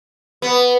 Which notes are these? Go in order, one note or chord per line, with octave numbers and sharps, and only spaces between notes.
B3